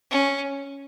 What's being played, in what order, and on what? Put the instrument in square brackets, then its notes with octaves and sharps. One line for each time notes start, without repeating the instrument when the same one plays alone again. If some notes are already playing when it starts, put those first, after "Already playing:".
[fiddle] C#4